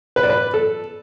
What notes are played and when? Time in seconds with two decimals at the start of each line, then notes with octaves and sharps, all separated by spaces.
0.16 B4
0.23 D5
0.29 B4
0.54 A4